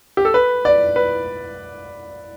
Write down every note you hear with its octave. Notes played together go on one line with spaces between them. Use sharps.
G4
A4
B4
D5
B4